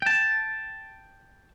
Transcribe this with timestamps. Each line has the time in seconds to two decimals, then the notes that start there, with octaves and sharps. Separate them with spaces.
0.02 G5 A5